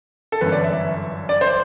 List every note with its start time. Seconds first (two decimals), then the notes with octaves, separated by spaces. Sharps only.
0.32 A4
0.41 G1 F#2 E3 B4
0.52 D5
0.64 E5
1.29 D5
1.41 C5